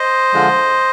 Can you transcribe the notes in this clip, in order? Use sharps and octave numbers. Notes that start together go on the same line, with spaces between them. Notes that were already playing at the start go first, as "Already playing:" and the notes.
Already playing: C5 D#5
D3 F3 G#3